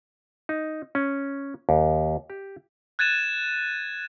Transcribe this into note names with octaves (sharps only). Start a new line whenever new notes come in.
D#4
C#4
D#2
G4
F#6 G#6 A6 D#7 E7